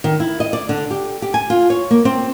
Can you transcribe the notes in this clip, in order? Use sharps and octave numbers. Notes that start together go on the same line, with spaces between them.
D#3
E4
D#5
D5
D3
G4
G4
G#5
F4
C#5
A#3
C4